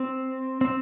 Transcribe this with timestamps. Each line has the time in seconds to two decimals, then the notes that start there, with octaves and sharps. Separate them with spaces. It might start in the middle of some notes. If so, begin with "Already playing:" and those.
Already playing: C4
0.61 C4